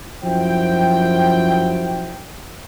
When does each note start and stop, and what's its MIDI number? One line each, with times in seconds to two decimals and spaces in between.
0.24 2.20 42
0.24 2.20 53
0.24 2.20 64
0.24 2.20 66
0.24 2.20 72
0.24 2.20 79